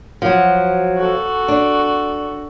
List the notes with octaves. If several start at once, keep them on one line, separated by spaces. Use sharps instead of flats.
F3 F#3
F#4 A4
D4